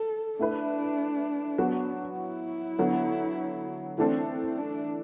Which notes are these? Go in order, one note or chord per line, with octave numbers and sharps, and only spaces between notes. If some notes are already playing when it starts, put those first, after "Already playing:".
Already playing: A4
A3 D4 E4 B4
F#3 B3 F#4
E4
D3 F#3 B3
E3 A3 C4 D4 A4
C4
D4